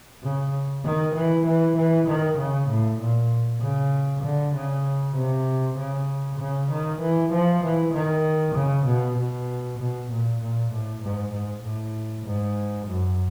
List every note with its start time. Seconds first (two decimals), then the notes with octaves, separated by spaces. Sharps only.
0.23 C#3
0.84 D#3
1.15 E3
1.46 E3
1.77 E3
2.07 D#3
2.38 C#3
2.69 A2
3.00 A#2
3.62 C#3
4.24 D3
4.54 C#3
5.16 C3
5.77 C#3
6.40 C#3
6.71 D#3
7.01 E3
7.32 F3
7.63 E3
7.94 D#3
8.55 C#3
8.86 B2
9.17 B2
9.78 B2
10.10 A#2
10.40 A#2
10.71 A2
11.02 G#2
11.33 G#2
11.63 A2
12.26 G#2
12.87 F#2